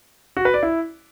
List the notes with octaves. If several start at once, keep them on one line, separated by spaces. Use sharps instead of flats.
F#4
B4
D5
E4